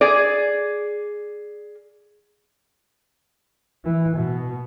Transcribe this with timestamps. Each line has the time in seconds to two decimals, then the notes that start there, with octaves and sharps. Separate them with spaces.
0.01 G#4 D5
3.85 E3
4.16 B2